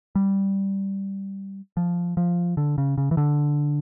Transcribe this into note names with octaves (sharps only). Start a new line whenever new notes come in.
G3
F3
F3
D3
C#3
C#3
E3
D3